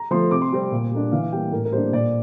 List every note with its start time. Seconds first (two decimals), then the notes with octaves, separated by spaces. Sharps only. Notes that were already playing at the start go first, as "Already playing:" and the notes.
Already playing: A#5
0.11 F3 A3 C6
0.31 C3 D6
0.42 C6
0.52 G3 C4
0.72 A#2
0.91 G3 A#3 D4
1.12 E3 F5
1.22 F5
1.32 G3 A#3 G5
1.52 A2 A#4
1.65 A#4
1.72 G3 A#3 D4 C5
1.93 A#2 D5